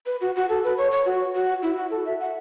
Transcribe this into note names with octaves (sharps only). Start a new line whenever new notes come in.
B4
F#4
F#4
A4
B4
C#5
C#5
F#4
F#4
E4
F#4
A4
E5
F#5